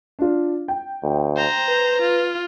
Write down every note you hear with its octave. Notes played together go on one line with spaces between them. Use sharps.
D4 F4
G5
D2
C5 A#5
B4
F4